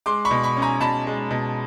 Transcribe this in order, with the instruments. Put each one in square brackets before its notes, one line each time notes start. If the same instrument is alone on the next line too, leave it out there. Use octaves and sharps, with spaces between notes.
[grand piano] G#3 C6 D6
B5 C#6
B2
B5 C#6
C#4
G#5 A#5
B2 A5 B5
G#3
B2